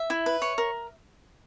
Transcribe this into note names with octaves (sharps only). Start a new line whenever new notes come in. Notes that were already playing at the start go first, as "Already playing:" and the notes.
Already playing: E5
E4
B4
C#5
A#4